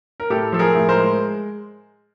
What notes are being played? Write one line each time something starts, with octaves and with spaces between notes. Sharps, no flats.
A#4
A2 G4 A4
F3 A4
G#4 A#4
A2
A#4 C5
G#3